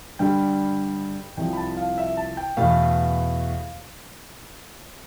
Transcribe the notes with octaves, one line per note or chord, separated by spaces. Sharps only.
G2 D3 G3 G5
C2 C3 F3 G5
B5
A5
F5
E5
A5
G5
E2 B2 A3 F5